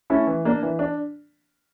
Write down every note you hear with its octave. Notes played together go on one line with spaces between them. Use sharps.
A3 C#4 E4 A4
E3
A#3 D4
E3
D4